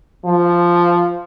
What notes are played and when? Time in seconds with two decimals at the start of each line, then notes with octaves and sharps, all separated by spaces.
0.25 F3